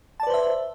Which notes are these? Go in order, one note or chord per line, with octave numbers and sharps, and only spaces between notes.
B4 C5 D5 E5 A5